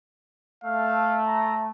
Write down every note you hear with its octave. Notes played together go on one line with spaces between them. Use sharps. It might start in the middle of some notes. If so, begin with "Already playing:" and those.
A3 F5
A#5